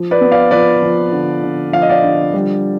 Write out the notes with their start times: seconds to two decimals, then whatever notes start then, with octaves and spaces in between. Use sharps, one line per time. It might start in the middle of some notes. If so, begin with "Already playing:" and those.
Already playing: F3
0.11 B4 D5
0.21 B3
0.32 D5 F5
0.51 F3 B4 D5
0.82 F3
1.12 D3
1.43 D3
1.73 F3 F5
1.82 D#5
1.89 D5 F5
2.03 D3
2.34 G3